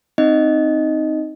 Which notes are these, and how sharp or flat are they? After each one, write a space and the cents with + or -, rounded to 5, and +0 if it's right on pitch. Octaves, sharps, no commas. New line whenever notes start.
C4 +0 D#4 +0 D#5 +0